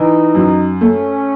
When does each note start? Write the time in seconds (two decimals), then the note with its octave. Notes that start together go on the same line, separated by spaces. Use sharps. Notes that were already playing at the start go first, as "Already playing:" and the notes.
Already playing: E3 D#4
0.35 F#2
0.81 A3 C#4